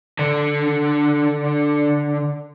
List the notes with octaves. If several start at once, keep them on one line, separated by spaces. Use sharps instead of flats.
D3 D4